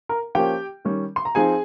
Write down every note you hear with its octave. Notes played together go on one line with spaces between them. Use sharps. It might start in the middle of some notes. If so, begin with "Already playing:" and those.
A#4 A#5
F3 A#3 C#4 G4 G5
D#3 G3 C#4
C6
A#5
F3 C4 D#4 G#4 G#5